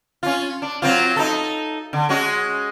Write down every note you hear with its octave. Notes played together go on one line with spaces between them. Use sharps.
C#4 F4
D4
F#3 C4 F4
D#4 A4
D3
G#3 C#4 F#4